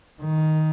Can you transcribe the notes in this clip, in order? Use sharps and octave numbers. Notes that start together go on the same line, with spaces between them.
D#3